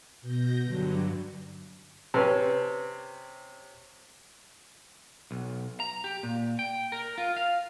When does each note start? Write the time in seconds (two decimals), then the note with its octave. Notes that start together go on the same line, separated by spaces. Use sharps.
0.22 B2 G6 A#6
0.63 G2 D3 F#3
2.14 C3 C#4 B4 C#5 A5
5.31 B1
5.80 A#5
6.04 G4
6.23 A#2
6.59 G5
6.92 A#4
7.18 F4
7.36 F5